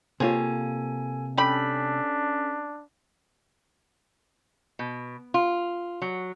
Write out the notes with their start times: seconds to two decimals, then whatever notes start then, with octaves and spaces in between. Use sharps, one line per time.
0.20 C3 A#3 F4 G#4 A4 C#5 G#5
1.38 G3 C#4 D4 G4 A4 B5 B6
4.79 B2
5.34 F4
6.02 F#3